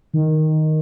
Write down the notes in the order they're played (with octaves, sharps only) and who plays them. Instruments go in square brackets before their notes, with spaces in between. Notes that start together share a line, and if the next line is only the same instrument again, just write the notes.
[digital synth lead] D#3